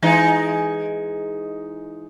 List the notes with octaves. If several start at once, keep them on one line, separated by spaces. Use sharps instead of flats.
E3 G#3 D#4